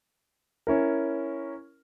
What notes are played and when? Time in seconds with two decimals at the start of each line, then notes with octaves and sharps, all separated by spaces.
0.67 C#4 E4 A#4